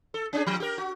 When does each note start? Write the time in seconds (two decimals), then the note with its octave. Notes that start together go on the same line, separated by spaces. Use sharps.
0.14 A4
0.33 C#4 D4 G#4
0.47 F3
0.60 G4 A#4
0.78 F#4